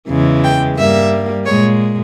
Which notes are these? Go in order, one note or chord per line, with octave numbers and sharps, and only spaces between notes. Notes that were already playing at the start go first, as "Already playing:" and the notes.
E2 C#3 E3 G#3
G5
G2 G3 A#3 E5
A#2 G#3 C#5